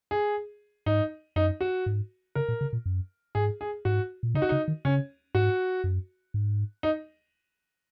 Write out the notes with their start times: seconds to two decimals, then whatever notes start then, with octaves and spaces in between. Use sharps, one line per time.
0.11 G#4
0.86 G#2 D#4
1.36 F#2 D#4
1.61 F#4
1.86 G#2
2.35 C#3 A#4
2.48 A#2
2.61 C#3
2.73 A#2
2.86 F#2
3.35 G#2 G#4
3.61 G#4
3.85 G#2 F#4
4.23 A#2
4.35 C#3 D#4
4.42 F#4
4.49 C#3 D#4
4.68 D#3
4.85 C#3 C#4
5.34 G#2 F#4
5.84 F#2
6.34 G#2
6.83 D#4